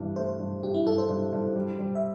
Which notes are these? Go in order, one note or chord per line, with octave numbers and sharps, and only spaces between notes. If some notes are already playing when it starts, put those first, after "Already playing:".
Already playing: G2 E3
A3 C5
G2
G2 G4
E4
G2 A4
C5
G2
G2
G3
G3
E5